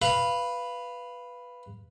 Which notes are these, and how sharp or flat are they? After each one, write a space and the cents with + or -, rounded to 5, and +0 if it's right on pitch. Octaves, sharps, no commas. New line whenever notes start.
B4 +0 F5 -15 B5 +0